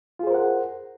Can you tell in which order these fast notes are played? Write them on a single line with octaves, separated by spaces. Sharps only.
F4 G#4 C5 A#4 F#5